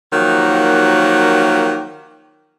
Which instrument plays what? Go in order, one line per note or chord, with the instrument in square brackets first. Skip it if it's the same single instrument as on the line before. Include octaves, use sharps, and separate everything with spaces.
[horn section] D#3 F3 F#3 A#3 G4 F#5